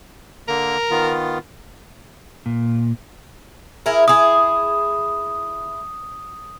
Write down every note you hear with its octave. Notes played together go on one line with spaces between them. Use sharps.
D3 A#3 A#4
D#3 B3 F4
A#2
E4 G#4 A#4
E4 G#4 D#6